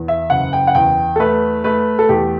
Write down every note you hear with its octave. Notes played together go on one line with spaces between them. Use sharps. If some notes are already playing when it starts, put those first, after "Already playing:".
Already playing: E2
E5
F#1 F#5
G5
F#5
E2 G5
A4
A3 B4
A3 B4
A4
E2 G4